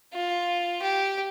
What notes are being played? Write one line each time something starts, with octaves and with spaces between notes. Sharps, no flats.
F4
G4